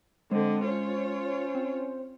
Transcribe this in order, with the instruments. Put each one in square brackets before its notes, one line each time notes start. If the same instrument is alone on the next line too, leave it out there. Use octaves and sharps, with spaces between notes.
[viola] D3 D#5 [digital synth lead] G#3 [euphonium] C4 [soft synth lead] C5
[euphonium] C#4 [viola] F4 C#5
[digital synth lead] C4